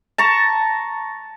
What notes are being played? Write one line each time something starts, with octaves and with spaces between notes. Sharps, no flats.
A5 A#5 C#6